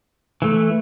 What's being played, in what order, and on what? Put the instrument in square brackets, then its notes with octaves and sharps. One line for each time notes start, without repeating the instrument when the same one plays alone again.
[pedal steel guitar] E3 A3